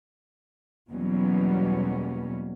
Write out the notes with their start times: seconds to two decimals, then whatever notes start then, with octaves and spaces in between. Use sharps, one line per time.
0.91 E2 B2 F#3 G3 A#3 C#4